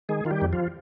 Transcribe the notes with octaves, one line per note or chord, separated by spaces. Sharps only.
D#3 G#3 G#4
D#3 F4
G3 G4
F2
F3 F4